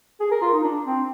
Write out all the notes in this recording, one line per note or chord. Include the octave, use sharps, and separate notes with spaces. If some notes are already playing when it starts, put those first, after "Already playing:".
G#4
A#4
F4
D#4
D4
C4